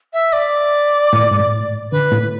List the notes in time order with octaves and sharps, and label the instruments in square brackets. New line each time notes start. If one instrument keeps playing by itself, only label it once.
[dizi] E5
D5
[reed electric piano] A2
G#2
A2
[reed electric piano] D3 [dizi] B4
[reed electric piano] A2